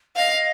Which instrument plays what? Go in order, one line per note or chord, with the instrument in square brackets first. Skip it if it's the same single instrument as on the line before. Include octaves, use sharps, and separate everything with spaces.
[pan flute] D#5 [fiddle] F5